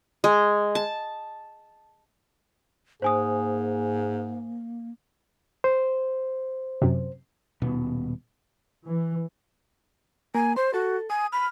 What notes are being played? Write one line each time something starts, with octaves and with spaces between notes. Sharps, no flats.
G#3
A5
G#2 A#3 G#4 C5 G#5 D#6
C5
F#2 C3
D#1 B2 B3
E3
A#3 G#5
C5 C6
F#4 A4
G#5 D#6
B5 F6